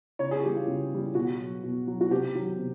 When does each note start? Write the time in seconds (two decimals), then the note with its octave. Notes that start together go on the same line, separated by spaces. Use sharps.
0.19 C#3 C#5
0.31 G#4
0.43 E3 G3 G4
0.55 F4
0.68 C#3
0.91 E3 G3
1.15 B2 F#4
1.39 F#3
1.63 B2
1.87 F#3
2.01 F#4
2.11 C3 G4
2.35 D#3 F#3
2.59 C3